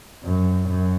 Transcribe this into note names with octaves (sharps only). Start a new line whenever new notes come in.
F#2
F#2